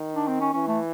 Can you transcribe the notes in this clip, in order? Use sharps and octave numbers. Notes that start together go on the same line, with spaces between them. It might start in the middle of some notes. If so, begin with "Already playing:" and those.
Already playing: D#3
D4
C4
C#4
E3 C#4
A3